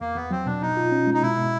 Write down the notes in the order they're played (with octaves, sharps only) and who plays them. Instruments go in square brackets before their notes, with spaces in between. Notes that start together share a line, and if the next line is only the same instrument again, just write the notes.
[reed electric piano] E2 [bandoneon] A#3
[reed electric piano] E2 [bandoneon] B3
[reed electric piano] F#3 [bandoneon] C4
[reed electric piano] B2 [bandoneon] D4
[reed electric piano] B2 [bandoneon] D#4
[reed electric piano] F4
C#4
G#3
[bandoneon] D#4
[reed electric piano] B2 [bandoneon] E4
[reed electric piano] B2